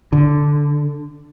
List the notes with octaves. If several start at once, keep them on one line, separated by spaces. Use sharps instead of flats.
D3